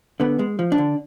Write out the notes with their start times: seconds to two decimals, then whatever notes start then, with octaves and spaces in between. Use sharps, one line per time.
0.20 D3 B3
0.39 G#3
0.59 F3
0.72 D4
0.78 D3